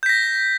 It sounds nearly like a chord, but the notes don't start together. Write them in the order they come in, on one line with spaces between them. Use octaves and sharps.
G6 B6 A#6